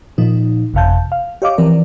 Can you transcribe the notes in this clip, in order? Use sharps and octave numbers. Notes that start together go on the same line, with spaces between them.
A#2 F3 D#4
G1 F2 C3 F5 A5 G6
F5
G4 C#5 D#5 F5 D6
E3 F3 C4 A#4 D5